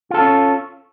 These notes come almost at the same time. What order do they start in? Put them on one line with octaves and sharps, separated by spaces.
F4 A4 C#4